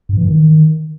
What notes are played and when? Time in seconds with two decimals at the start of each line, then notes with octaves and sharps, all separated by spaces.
0.09 G2
0.17 E3
0.25 D#3